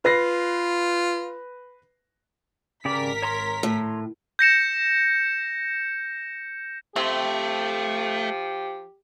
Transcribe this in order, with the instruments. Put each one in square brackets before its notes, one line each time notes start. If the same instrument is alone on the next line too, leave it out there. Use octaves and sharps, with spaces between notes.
[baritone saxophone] F4 [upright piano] B4 A#6 C7
[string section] G#1 A#4 B6 [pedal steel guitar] C#3 G4 D5
[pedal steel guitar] C#5 A#5 C6
[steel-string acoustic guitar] A2
[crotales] G6 A#6 C#7 E7
[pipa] C3 C4 [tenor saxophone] F3 [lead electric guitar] A3 [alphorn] G4